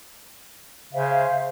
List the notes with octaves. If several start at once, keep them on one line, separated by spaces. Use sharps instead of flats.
C#3 C5 E5 F5